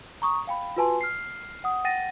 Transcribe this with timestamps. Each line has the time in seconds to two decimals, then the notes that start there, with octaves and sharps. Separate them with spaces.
0.22 A#5 C#6 D#6
0.47 F5 G5 B5
0.76 F4 F#4 B4 G#5 A5 C6
1.01 F6 C7
1.64 F#5 D#6
1.85 F#5 G5 A6 A#6 D#7